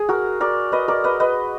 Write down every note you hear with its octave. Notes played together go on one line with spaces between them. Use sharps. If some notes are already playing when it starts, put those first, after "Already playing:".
Already playing: G#4
F#4 A#4
A#4 D5
B4 D#5
A#4 D5
B4 D#5
B4 D#5